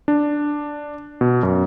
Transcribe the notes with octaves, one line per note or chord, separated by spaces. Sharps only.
D4
B2
F#2